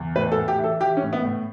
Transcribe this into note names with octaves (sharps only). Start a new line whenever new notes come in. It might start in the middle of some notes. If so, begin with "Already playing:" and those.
Already playing: E2
A2 B4
A4
A2
G4
E3
A4
E3 G4
C#4
A2
B3
A2